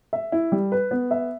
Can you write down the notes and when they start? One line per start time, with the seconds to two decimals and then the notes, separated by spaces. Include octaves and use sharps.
0.13 E5
0.32 E4
0.52 G3
0.72 B4
0.91 B3
1.11 E5